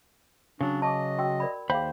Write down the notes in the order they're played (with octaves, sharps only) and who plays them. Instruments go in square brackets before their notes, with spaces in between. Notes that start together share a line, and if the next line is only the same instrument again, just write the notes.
[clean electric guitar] C#3 F#3 [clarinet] D4
[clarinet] D#5 [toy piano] A5 C#6 D6
[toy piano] F#4 G5 E6
A#4 D5 B5
[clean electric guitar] D#2 C5 B5 [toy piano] G#4 F5 G5